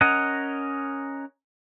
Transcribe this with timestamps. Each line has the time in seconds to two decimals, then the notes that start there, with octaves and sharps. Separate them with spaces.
0.01 C#4 A#4 D#5 F#5